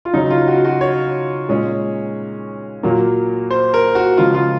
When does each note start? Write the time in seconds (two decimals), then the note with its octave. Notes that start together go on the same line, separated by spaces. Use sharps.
0.05 F4
0.13 C#3 F#3 C#4 D#4
0.30 F4
0.48 F#4
0.65 F#4
0.81 C#5
1.49 A#2 G#3 C#4
2.83 A#2 F#3 A#3
3.50 C5
3.74 A#4
3.95 F#4
4.17 C#3 F3 G#3 F4
4.34 F4